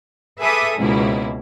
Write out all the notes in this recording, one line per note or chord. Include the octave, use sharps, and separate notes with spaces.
G#4 A4 B4 E5 D6 D#6
C#2 G#2 B2 A#3 E4